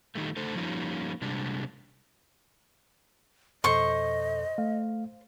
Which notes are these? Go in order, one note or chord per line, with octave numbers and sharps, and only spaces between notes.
D#3 G3 A3
D3 A3 A4 C5
F3 G3 A#3 C#4 D#4
C3 G3 G#3 D4
F2 B2 A4 C5 D#5 C#6
A3 F5